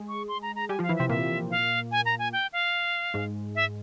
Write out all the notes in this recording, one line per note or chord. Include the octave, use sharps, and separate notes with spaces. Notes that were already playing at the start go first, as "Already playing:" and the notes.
Already playing: G#3 G#4
C#6
C6
A#5
A#5
G3 G4 G#5
F3 F4
F5
E3 E4
C3 C4 E5
A#2 A#3 E5
F5
G#5
A#5
G#5
G5
F5
G#2 G#3
E5